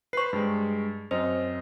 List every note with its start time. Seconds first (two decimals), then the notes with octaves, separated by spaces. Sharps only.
0.13 B4 C5 C#6 C7
0.33 G2 G#3
1.11 F#2 C4 C5 D#5